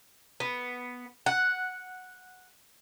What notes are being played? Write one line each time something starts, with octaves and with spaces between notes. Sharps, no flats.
B3
F#5